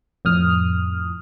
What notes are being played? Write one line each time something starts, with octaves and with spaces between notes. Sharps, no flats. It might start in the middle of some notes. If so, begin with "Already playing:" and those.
F2 A2 D#6 F6